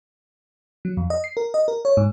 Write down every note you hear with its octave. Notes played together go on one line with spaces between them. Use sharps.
F#3
F2
D#5
C7
A#4
D#5
A#4
C#5
G#2